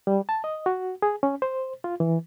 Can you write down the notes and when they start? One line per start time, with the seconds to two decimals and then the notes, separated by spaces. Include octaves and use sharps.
0.07 G3
0.29 A5
0.44 D#5
0.66 F#4
1.02 G#4
1.23 C#4
1.42 C5
1.84 F4
2.00 E3